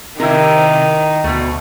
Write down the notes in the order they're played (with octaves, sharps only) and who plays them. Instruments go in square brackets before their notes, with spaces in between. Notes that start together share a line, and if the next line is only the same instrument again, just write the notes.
[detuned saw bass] C3 [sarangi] D#3 [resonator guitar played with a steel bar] E4 A#4
[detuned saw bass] D2 [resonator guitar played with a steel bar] B2 A3